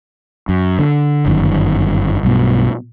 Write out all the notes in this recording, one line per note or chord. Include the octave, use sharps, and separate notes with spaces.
F#2
D3
G1 F#2 D#3
B1 G2 B2